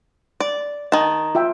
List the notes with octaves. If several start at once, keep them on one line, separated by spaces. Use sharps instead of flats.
D5
D#3 A5
F4 E5 G5